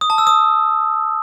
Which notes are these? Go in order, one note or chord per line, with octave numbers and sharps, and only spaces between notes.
D#6
A5
E6
D#6